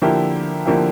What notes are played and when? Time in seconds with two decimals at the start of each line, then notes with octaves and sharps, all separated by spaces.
0.02 D3 F3 A#3 E4 G4
0.66 D3 F3 A#3 E4 G4